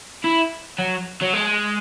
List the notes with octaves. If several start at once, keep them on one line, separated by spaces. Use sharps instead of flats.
E4
F#3
F#3
G#3